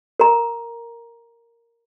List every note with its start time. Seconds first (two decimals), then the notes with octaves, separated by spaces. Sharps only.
0.20 A#4 A#5